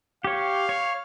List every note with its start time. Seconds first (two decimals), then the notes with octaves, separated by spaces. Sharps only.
0.24 G4 C#5 F5
0.69 C#5